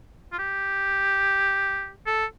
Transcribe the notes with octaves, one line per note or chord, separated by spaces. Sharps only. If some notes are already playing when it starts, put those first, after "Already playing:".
F4
G4
A4